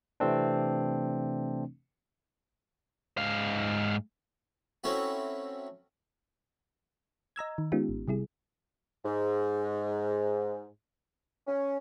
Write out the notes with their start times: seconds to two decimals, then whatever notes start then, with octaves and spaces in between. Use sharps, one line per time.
0.20 C3 E3 A3 C4 D4
3.18 G#2 F5
4.84 A3 C4 C#4 E4 F#4
7.36 D#5 A#5 E6 G#6
7.58 D#3
7.72 G#3 B3 C#4 D#4 F4 G4
7.89 G#1
8.08 C3 G3 E4 G#4
9.05 G#2
11.47 C#4